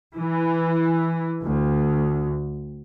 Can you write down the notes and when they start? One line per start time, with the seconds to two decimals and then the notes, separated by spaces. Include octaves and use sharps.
0.14 E3
1.44 D2